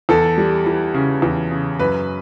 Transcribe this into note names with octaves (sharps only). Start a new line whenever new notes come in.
E2 A4
G3
E3
C#3
E2
C#3
F#2 B4